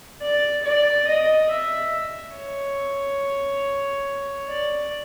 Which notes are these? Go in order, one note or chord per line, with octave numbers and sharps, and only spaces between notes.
D5
D5
D#5
E5
C#5
D5